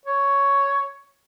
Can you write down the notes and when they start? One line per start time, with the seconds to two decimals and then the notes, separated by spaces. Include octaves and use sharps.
0.06 C#5